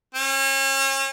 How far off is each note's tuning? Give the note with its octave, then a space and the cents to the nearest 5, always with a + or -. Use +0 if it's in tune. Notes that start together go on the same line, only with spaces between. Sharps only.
C#4 -35